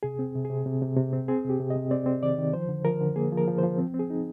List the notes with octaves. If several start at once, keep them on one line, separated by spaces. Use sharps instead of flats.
C3 G#4
C4
C3
G#4
C3
C3
C3
C3
C4
C4 G#4
C3 G4
C3
D#5
C3
C4 D5
C4
D#3 D5
D#3
F3 C5
D3
F3 A#4
D3
A#3 G#4
F3
A#4
F3
F3 C5
C4
C4
G#4
D#4